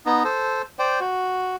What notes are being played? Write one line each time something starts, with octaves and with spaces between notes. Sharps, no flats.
B3 D#4
A4 C5
C5 D5 G5
F#4